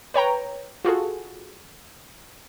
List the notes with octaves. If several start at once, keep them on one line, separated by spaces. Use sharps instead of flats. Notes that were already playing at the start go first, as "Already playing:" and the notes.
B4 C#5 G5 A#5
F4 F#4 G#4 A4